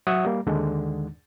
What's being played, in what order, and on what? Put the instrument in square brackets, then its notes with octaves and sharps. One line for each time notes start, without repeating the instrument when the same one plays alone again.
[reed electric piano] F#3 C#5 E5 F#5 D#6
G3 A#3
D#2 D3 D#3 G#3